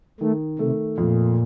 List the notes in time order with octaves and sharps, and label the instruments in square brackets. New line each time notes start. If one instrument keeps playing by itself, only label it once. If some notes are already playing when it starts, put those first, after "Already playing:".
[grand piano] D#3 [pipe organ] A3
[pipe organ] C3 [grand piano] A3
[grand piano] F2 [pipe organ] A#2